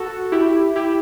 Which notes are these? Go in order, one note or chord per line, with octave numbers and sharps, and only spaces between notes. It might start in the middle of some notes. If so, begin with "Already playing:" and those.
Already playing: F#4 A4
E4 G4
E4 G4